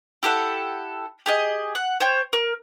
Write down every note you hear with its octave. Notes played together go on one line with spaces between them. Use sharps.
E4 G4 A4 F#5
G4 G#4 D#5
F#5
C5 C#5 G5
A#4